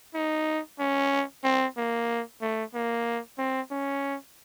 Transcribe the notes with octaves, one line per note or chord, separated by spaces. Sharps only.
D#4
C#4
C4
A#3
A3
A#3
C4
C#4